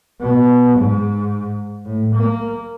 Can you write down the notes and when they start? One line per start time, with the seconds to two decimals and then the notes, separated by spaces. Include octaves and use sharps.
0.21 B2
0.78 G#2
1.85 A2
2.15 A#3